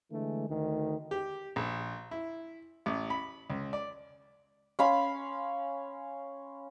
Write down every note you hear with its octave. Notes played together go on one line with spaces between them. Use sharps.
D3 E3 G#3 A3
D2 D#3
G4
A#1
E4
A1
B5
C#2
D5
C#4 F5 B5 C6